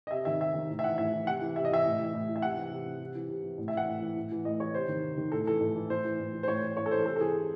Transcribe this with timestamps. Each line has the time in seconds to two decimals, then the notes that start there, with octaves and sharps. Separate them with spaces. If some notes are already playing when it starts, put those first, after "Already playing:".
0.07 D#5
0.11 C3 E5
0.25 D#3 E5
0.40 C3 E5
0.55 D#3
0.69 A2
0.79 E5
0.84 E3 F#5
0.98 A2 E5
1.12 E3
1.27 C3 F#5
1.41 E3
1.56 C3 E5
1.65 D#5
1.70 E3 E5
1.85 A2
1.99 E3
2.13 A2
2.29 E3
2.36 E5
2.42 C3 F#5
2.57 E3
2.71 C3
2.86 E3
3.01 C3
3.15 E3
3.29 C3
3.44 E3
3.58 A2
3.68 E5
3.74 E3 F#5
3.88 A2
4.02 E3
4.16 A2
4.32 E3
4.45 A2 D#5
4.60 E3 C#5
4.74 C3 C5
4.89 D#3
5.03 C3
5.17 D#3
5.32 A2 A4
5.47 E3 A4
5.61 A2
5.75 E3
5.90 A2 C5
6.05 E3
6.20 A2
6.33 E3
6.43 C5
6.48 A2 C#5
6.63 E3
6.77 A2 C#5
6.86 A4
6.91 E3 C5
7.06 C3 A4
7.16 A4
7.20 E3 G#4
7.34 C3